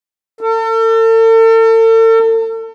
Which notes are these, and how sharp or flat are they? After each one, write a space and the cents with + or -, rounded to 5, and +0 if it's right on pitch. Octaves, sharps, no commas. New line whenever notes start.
A4 +40